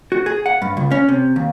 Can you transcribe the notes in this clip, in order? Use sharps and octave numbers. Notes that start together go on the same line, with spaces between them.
F#4
G#4
F#5
G2
C#2
C#4
C3
D#2